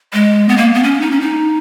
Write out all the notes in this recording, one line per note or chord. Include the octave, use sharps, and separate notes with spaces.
G#3
B3
A#3
B3
C#4
D#4
C#4
D#4